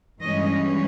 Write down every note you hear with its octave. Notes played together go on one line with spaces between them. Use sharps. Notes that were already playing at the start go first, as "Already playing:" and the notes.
G2 E3 G#3 C#4 D#5